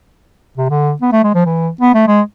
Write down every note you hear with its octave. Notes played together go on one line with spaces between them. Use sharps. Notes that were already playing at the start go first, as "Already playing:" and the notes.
C3
D3
B3
A3
G#3
F3
E3
B3
A3
G#3